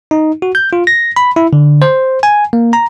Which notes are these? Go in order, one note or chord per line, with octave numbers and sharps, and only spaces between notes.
D#4
F#4
G6
F4
A#6
B5
E4
D3
C5
G#5
A#3
A#5